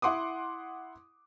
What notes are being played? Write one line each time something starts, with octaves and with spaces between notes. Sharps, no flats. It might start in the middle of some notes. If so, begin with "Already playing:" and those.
E4 F#5 C6 D6 D#6